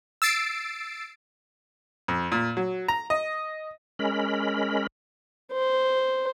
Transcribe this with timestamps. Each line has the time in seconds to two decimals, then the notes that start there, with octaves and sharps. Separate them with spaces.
0.22 E6 A6 C7 D7
2.08 F2
2.32 A#2
2.57 F#3
2.88 A#5
3.10 D#5
3.99 G#3 C#4 A#4 B5
5.53 C5